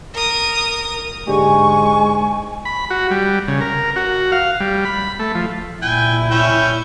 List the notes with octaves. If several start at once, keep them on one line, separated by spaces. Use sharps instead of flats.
A#4 D#6
G#2 D3 G#3 G4 G#5 C#6
B5
F#4
G3
C#3
A#4
F#4
F5
G3
B5
A3
F3
A#2 E4 G5 G#5
C#4 E5 G5